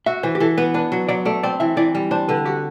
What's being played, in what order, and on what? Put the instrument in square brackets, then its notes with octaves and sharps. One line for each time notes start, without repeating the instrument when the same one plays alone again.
[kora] F#4 [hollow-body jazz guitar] E5
[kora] E3 [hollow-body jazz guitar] C5
[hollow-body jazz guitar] G4
[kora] E3 [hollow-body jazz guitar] A4
[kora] B3 [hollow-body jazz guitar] B4
[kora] D4 [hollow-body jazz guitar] B4
[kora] F#3
[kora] F#3 [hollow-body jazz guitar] D5
[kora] A3 [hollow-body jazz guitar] D5
[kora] C4 [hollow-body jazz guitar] D5
[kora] E3 [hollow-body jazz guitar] E5
[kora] E3 [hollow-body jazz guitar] D5
[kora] G3
[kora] D4 [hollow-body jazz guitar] C5
[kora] D3 [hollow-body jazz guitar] B4
[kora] F#4 [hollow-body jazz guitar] G4